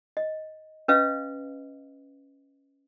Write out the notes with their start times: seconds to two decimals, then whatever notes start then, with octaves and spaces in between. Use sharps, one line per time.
0.17 D#5
0.88 C#4 B4 D#5 F5